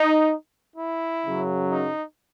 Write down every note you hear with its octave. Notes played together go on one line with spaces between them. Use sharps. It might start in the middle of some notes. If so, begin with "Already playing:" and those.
Already playing: D#4
E4
F#2 C#3 F#3
D#4